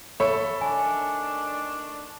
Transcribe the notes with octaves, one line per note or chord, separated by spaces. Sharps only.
A4 C#5 E5 B5
D#3 A3 D4 G#5